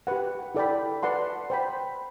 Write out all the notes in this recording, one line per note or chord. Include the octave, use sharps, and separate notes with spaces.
G4 B4 F#5
E4 A4 D5 G5 B5
B4 D5 F#5 A5 C6
C5 G5 B5